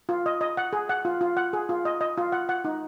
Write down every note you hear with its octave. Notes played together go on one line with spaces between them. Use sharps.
F4
D#5
D#5
F#5
G#4
F#5
F4
F4
F#5
G#4
F4
D#5
D#5
F4
F#5
F#5
D#4